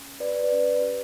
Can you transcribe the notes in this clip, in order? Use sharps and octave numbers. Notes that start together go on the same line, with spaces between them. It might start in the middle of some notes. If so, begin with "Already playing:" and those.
Already playing: C#4
G4 B4 D5
B4 D5
C#4
G4